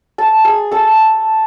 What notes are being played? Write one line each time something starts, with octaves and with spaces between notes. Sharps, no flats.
A4 A5
G#4 G#5
A4 A5